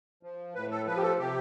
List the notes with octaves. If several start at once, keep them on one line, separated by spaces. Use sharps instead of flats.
F3
A2 B4
A4
F3 B4
G4
A4
C3 G4